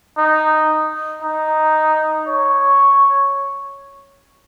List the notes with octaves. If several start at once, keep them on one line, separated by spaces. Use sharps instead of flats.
D#4
D#4
C#5